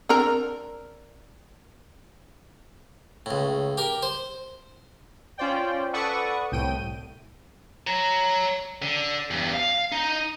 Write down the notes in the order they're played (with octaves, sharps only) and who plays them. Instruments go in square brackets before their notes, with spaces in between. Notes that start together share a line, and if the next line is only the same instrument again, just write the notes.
[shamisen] C4 D4 A#4
[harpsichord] C#2 A2
G4 A#4
C5
[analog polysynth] C#4 F4 C5 D5 G5
A4 B4 D5 F#5 C#6 D#6
C2 A2 G5 D#7
[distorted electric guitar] C#5 A#5
D3
E2 G2
F5
D#4